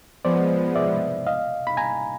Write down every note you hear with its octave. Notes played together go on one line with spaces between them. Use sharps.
F3 G#3 B3 C5 D5
D5 E5
D#5 F5
B5
G#5 A#5